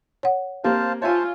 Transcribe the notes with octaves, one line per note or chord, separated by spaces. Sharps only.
C#5 F#5
A#3 C4 G4 C5 F5 A5
F4 C5 C#5 E5 G#5 A5